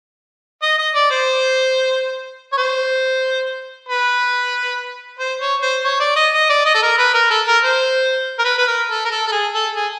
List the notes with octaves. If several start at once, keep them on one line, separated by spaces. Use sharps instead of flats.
D#5
D#5
D5
C5
C#5
C5
B4
C5
C#5
C5
C#5
D5
D#5
D#5
D5
D#5
A4
A#4
B4
A#4
A4
A#4
C5
A#4
B4
B4
A#4
A4
A#4
A4
A4
G#4
A4
G#4